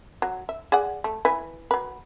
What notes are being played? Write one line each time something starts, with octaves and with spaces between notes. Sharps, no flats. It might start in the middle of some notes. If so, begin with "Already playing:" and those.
F#3
E5
G#4 D5 F#5
A3
E3 B4 E5
F#3 B4